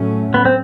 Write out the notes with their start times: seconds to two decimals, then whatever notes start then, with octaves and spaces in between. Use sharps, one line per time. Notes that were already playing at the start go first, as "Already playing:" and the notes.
Already playing: A2 F#3 A3 C#4
0.34 B3
0.45 C4